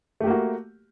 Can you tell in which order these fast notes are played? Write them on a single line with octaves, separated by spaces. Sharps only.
A3 G4 A#3 F#4